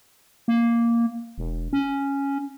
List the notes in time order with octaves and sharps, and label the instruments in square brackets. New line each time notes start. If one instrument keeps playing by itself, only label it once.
[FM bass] A#3
E1
C#4